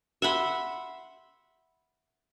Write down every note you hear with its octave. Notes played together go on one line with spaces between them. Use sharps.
E5 F#5 B5 C6